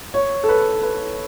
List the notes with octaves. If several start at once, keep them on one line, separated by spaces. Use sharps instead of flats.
C#5
A4
B4
B4